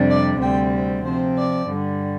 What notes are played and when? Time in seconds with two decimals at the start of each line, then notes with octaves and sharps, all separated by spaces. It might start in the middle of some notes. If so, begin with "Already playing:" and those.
Already playing: F2 C3 G3 D4
0.10 D5
0.41 D2 C3 G3 C4 G5
1.05 C3 F3 C4 C5
1.37 D5
1.69 G2 D3 G3